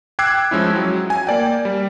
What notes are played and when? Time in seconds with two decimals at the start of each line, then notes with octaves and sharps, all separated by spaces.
0.19 G5 D6 E6 F#6 G#6 C7
0.51 F3 G#3 C#4 E4
0.76 F#3
1.10 G#5
1.27 A#3 D5 G5
1.65 G3